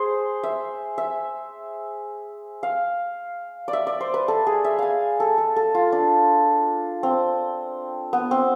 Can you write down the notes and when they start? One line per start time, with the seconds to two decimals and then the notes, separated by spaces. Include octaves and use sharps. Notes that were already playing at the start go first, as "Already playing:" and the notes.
Already playing: G#4 C5
0.43 E5
0.98 E5
2.63 F5
3.68 D5
3.73 E5
3.87 D5
4.01 C5
4.14 B4
4.28 A4
4.47 G#4
4.64 E5
4.79 F5 G#5
5.20 A4
5.38 A4
5.56 A4
5.75 F4
5.92 D4
7.03 C4
8.13 B3
8.31 C4